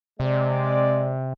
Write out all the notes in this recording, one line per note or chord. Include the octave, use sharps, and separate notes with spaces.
C3 G#3 C4 D5